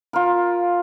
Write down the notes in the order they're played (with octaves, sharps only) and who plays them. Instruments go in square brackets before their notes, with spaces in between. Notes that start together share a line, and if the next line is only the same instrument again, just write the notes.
[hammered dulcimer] F4 A#4